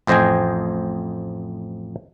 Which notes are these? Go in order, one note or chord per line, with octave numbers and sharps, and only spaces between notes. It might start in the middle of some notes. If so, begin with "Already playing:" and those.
A1 F2 C5 D#5 G5 G#5